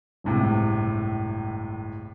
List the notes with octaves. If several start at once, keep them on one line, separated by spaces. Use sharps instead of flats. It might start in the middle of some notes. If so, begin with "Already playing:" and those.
G1 C#2 A2 C3